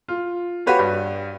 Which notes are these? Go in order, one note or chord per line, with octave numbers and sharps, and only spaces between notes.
F4
F#4 G4 B4 C#5 F5
G2